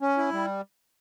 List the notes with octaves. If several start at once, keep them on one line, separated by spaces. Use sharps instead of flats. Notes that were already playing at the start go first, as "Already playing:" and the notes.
C#4
E4
G3